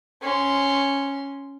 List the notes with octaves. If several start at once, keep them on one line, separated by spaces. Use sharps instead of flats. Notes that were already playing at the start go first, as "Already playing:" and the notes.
C#4 C6